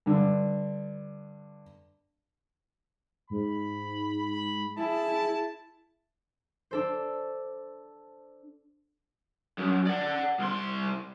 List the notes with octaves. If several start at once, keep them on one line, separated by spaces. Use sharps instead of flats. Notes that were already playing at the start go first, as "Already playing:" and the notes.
G2 D3
G#2 B5
B5
E4 G#4 A5
D4 A4 C5
F#2
D5 F#5
C2 C6